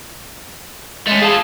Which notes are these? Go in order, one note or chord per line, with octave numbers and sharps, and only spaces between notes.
G#3 A3 C#4
F4 G#4 A4